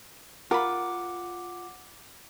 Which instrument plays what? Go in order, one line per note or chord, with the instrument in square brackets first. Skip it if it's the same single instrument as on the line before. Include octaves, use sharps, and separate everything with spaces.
[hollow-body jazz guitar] F4 B5 [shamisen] A#4 [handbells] F#5 D6